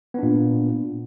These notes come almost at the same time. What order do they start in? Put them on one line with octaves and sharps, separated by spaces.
B3 D4 A#2